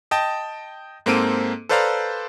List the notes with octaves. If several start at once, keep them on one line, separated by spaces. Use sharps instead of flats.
D#5 G5 A5
G#2 A#3 C4 A4 D7 D#7
A4 B4 C5 D5 F5 A#5